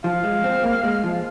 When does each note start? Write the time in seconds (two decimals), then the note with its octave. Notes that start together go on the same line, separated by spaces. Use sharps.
0.04 F3 F5
0.24 G#3
0.44 C4
0.64 A#3
0.83 G#3
1.04 F3